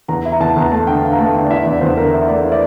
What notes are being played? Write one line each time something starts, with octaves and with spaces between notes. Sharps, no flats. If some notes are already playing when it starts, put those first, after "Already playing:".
E2 A#5
E4
A#5
E2 A5
E2 A#5
A3 A5
D3 G5
D3 F5
A#5
A3 A5
D3 G5
D5
E4 E5
E2 D5
E2 C5
D3 A#4
E4
A3 D5
E4
D5